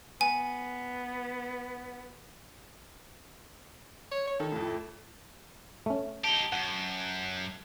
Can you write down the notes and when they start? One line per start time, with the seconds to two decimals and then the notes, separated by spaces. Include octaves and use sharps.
0.21 B3 G#5
4.12 C#5
4.27 C#5
4.40 D#3 A4
4.52 F2 A2
5.86 A3 C#4
6.24 D#4 G4 A5 F7 G7
6.52 F#2 F#5